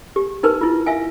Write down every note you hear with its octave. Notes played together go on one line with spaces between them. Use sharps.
G4
D#4 A#4 B4 A5
E4 F4
E5 F5 G#5